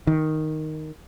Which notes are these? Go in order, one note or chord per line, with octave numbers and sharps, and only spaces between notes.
D#3